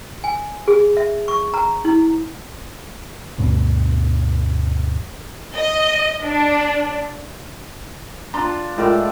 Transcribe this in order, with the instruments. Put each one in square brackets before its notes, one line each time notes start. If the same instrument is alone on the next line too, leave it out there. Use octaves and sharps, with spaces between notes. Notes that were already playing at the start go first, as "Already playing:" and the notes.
[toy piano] G#5
G#4
E5
C#6
A#5
E4
[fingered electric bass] D2 G2 B2
[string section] D#5
D4
[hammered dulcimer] D4 F4 [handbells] A#5 C6
[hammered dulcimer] A2 D5 [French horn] G#3 [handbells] E4 F4 A#4